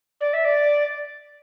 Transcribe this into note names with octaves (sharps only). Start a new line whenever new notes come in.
D5
E5
D5